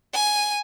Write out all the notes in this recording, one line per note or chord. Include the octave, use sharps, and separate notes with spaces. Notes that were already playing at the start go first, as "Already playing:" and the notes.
G#5